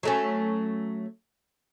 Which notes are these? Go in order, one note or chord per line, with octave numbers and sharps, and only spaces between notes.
F#3 A3 C#4